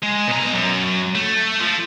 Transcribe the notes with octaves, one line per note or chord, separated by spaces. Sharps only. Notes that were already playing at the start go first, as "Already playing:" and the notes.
G#3
B2 A#5
F#2
A3
F3